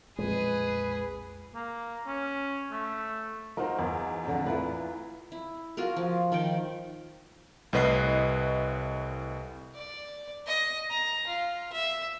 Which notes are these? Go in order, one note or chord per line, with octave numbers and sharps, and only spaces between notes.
B1 F2 A#2 G#3 G#4 B4
A#3
C#4
A3
D#4 F4 F#4 A#4 C5
E2
F2 D3
E4 F4 B4
E4
F4 F#4 G#4 A#4
F3
D#3 F3 G5
C2 A2 B4 D#5 F#6 C7
D5
D#5
A#5
F4
E5